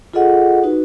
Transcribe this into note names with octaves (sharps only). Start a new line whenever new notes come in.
F4 G#4 A4 D#5 F#5
D#4 F#4 B4